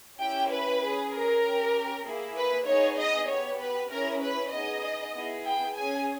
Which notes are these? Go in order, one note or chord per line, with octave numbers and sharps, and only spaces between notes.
C#4 E4 G4 G5
B4
C#4 G#4
A#4
C#4 G4
A#3 E4 G#4
B4
B3 D#4 G#4 C#5
D#5
B3 G4 C#5
B4
C#4 E4 G#4 A#4
B4
B3 D#4 G#4 D#5
B3 E4 G#4
G5
C#4 G#4 G#5